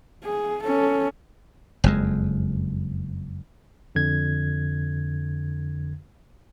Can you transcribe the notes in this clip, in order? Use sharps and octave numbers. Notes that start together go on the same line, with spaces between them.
G#4
C#4 A4
F#1 F2 G#3
F2 D3 G#6